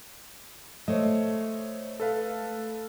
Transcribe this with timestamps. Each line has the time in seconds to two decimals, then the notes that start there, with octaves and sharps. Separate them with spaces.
0.88 A3 C5 C#5 D#5
2.00 A4 B4 F5